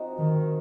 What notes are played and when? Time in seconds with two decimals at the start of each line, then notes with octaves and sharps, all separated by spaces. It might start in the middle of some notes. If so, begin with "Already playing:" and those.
Already playing: F3 C4 D#4 F#4
0.18 D#3